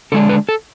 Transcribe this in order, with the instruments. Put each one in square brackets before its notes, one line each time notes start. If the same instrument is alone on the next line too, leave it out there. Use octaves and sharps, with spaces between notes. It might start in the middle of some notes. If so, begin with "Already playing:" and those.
[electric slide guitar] D3 G#3 D4 A4
B4
A4